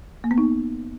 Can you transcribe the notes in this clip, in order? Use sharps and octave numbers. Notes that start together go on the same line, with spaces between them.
A#3
B3
D#4